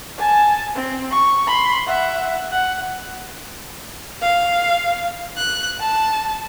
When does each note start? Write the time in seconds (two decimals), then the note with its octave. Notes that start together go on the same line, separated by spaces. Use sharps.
0.18 G#5 A5
0.75 C4
1.11 C#6
1.47 B5 C6
1.86 E5 F#5
2.51 F#5
4.22 F5
5.37 F#6
5.80 A5